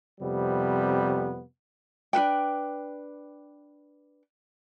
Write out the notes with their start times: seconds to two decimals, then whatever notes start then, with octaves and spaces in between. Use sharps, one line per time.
0.20 F2 C3 G3 B3
2.13 D4 F#4 B4 G5